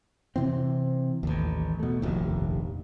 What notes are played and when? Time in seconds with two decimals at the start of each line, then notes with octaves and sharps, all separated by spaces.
0.36 C3 E3 C4
1.23 A1 D#2
1.79 B2 A3
2.02 F1 A#1 D#2